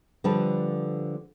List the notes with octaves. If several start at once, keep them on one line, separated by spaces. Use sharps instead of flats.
D3 F3 G3 B4 D5 A5